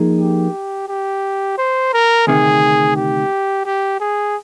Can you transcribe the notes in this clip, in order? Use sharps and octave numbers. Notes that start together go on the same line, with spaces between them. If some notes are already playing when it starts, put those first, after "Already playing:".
Already playing: F3 A#3 D#4 G#4
G4
G4
C5
A#4
D2 C3 D#3 G#4
G4
G4
G#4